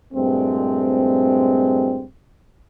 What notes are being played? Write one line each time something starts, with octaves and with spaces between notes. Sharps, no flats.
G2 A#2 G#3 A3 C4